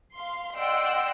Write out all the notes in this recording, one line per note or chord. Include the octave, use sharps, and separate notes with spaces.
F5 C6
D5 D#5 F#5 G5 C6 E6